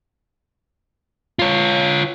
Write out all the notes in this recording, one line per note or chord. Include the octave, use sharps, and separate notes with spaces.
F4 C#5